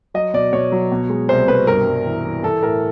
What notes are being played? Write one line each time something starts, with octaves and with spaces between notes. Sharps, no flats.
F#3 D#5
B2 D5
B2 C#5
F#3
B2
G#3
C2 C5
B2 B4
G2 A#4
G2
E3
E3
E3 A4
A2 A#4